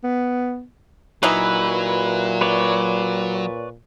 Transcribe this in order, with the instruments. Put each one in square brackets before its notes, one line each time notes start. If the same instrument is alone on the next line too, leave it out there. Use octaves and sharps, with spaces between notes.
[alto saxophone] B3
[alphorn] A#2 [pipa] E3 D#4 E4 [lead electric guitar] F#3 [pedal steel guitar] B4
[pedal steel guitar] B4 C#5 D5